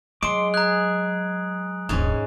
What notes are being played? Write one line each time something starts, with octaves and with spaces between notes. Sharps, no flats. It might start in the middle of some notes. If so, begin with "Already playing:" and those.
F#3 G#3 C6 D6 D7
G#4 A#5 F#6
D#1 A#1 G#2 C#4